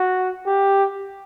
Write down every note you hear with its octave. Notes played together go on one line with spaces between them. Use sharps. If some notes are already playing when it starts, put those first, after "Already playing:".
Already playing: F#4
G4